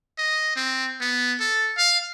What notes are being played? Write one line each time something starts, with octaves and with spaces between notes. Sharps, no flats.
D#5
C4
B3
A4
F5